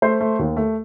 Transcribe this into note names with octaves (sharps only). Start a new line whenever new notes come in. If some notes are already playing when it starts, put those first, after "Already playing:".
A3 C5 C6
A3
D#2
A3